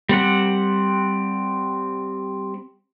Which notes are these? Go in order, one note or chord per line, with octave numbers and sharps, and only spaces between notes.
G3 C4 F#5